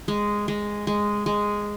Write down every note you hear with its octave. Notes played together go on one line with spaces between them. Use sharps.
G#3
G#3
G#3
G#3